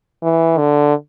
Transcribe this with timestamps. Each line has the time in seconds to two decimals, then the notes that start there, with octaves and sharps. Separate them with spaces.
0.23 E3
0.58 D3